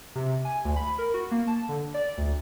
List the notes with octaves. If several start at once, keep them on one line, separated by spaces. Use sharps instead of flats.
C3
G#5
D2
B5
A#4
F#4
A#3
A5
D3
D5
D2